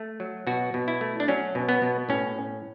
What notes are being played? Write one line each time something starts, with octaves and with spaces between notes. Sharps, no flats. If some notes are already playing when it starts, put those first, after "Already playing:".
Already playing: A3
F#3
B2 F#4
B2
E4
A3
D4
F#3 C#4
B2
B3
B2
A2 C#4